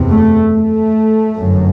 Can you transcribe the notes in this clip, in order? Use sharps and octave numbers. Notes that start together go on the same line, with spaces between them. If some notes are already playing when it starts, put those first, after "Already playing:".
Already playing: F#1 E2 C3
A3
A3
G1 F#2